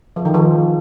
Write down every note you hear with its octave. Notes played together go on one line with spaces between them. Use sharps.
F3
D#3
F3